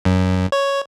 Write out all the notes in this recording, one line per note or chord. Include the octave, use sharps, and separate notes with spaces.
F#2
C#5